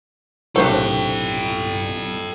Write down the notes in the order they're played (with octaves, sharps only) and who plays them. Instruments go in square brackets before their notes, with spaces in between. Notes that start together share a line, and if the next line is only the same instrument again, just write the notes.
[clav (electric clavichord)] B1 A2 C3 [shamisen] D4 C5 C#5 [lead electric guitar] A4 G5